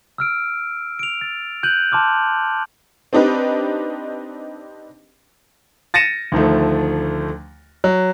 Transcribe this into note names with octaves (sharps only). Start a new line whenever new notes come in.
E6 F6 D7
D7 F7
A6
F#6 G6 D#7 F#7
A5 C6 D6 F6
C4 D4 D#4 G4 B4
A6 A#6 C#7 D#7 E7
D2 D#3 F3 A3
F#3